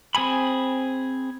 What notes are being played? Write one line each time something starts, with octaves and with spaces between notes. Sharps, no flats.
C4 G#4 G#5 B5